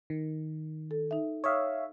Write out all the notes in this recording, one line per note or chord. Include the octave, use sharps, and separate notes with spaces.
D#3
A4
D#4 E5
C#5 E5 F5 C#6 D#6 F6